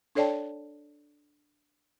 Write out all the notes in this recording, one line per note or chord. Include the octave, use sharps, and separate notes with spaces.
D4 A4 C#5 D5 G5 A5